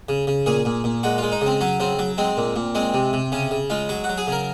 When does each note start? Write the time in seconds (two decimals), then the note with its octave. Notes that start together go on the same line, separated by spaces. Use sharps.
0.09 C#3
0.27 C#3
0.46 A#2 G#4
0.65 A#2
0.84 A#2
1.03 G#3 F#4
1.18 G#3 F4
1.32 D#4
1.41 C#3 C4
1.61 F#3 C#4
1.80 C#3 C4
1.99 F#3
2.18 G#3 C4
2.37 A#2
2.56 A#2
2.75 G#3 C4
2.94 C3
3.13 C3
3.32 C#3 C#4
3.51 C#3
3.70 G#3 F4
3.89 F#3 F#4
4.04 F#4
4.09 F#3
4.18 G#4
4.27 C#3 A#4